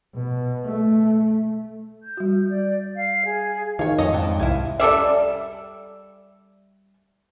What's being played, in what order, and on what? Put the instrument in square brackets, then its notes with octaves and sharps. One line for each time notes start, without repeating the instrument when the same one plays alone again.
[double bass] B2
A3
[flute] G6
[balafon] G3 F#4
[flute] D5
F5
G#4
[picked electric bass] D#3 [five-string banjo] C#5 F5
[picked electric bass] F2 G#2 [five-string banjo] C#4 A4 D#5
[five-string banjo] C4 D4
[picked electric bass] C2 [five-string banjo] E4 F5 G#5
[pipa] G3 A4 D5 E5